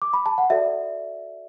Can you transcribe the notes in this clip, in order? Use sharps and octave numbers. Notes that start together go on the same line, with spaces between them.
D6
B5
A5
F#5
F#4 A4 D5 E5